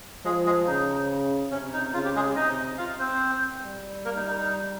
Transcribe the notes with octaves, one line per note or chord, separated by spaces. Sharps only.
F3 G#3 G#4
G#3 G#4
C#3 D#4
C3 C#4
D#4
C#3 F4
G4
G#3 G#4
C3 D#4 D#5
F4 F5
C4 C5
G3
A#3 A#4
D#4
D#4
D#4